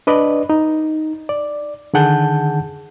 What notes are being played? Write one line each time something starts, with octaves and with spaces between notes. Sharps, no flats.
D4 B4 D5 D#5
D#4
D5
D3 D#3 G#4 F#5 A5 G6